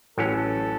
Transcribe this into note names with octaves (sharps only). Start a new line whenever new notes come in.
A1 A2 F#3 C#4 A4